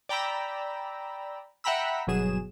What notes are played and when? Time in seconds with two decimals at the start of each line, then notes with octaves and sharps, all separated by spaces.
0.09 D5 G5 A#5 B5 E6
1.64 E5 F#5 G5 A#5 B5 E6
2.07 G1 B2 F#3 G#4 E7